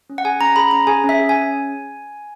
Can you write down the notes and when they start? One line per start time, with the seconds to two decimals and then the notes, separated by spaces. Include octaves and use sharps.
0.10 C#4
0.18 F#5
0.25 G#4 G#5
0.41 C#4 A#5
0.56 G#4 B5
0.71 C#4 A#5
0.87 G#4 G#5
1.04 C#4
1.09 E5
1.19 G#4
1.29 G#5
1.34 C#4